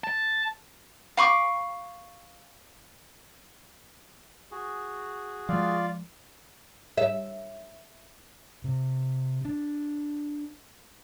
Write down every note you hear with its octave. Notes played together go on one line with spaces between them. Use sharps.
A5
F5 B5 C#6 D6
F#4 G#4
F3 G#3 F4 D5 F5
E5
C3
D4